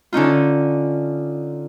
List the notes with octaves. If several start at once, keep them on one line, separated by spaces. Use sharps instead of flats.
D3 C#4 D#4 F4